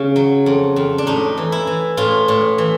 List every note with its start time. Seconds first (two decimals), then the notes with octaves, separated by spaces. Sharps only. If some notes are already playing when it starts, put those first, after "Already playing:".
Already playing: C#3
0.16 F#3
0.46 F2
0.76 F2
0.98 D4
1.07 A2 D#4
1.38 E3
1.52 E4
1.67 E3
1.97 A2 F4
2.28 A2
2.58 E3